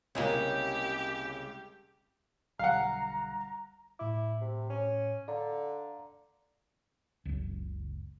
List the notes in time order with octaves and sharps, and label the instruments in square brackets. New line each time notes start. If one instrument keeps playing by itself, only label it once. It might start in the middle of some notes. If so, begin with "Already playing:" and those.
[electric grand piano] C2 [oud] C#3 G#3 A#3 [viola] G4
[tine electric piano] B1 D3 G3 [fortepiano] F5 F#5 [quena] A#5
[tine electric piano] A2 D6 [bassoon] E4
[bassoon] C3
C#4
[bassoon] D3 [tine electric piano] D5 F5 A#5
[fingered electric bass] F#1 C#2